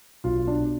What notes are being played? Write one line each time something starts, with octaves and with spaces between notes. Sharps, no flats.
B1 F4
D4
B2